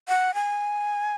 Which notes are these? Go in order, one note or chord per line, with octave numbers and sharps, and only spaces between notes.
F#5
G#5